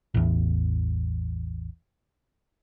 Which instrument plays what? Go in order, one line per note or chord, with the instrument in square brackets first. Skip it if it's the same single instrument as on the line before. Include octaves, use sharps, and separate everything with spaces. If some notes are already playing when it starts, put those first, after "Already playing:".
[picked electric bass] A1 E2